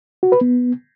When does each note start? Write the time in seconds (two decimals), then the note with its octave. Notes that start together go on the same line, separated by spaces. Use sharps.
0.23 F#4
0.32 B4
0.41 B3